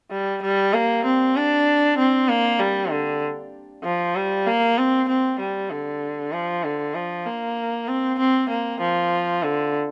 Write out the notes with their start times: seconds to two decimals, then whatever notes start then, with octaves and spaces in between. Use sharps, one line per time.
0.11 G3
0.43 G3
0.74 A#3
1.05 C4
1.36 D4
1.98 C4
2.28 A#3
2.59 G3
2.91 D3
3.84 F3
4.15 G3
4.47 A#3
4.78 C4
5.08 C4
5.39 G3
5.70 D3
6.33 F3
6.64 D3
6.95 F3
7.26 A#3
7.88 C4
8.19 C4
8.49 A#3
8.81 F3
9.43 D3